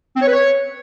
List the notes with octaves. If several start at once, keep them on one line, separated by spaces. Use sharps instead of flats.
C4
C#5
B4
C#5